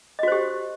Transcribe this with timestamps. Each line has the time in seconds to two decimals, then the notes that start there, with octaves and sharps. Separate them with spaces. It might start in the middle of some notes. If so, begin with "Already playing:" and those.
0.19 D#5
0.23 F#4
0.28 C5
0.32 G4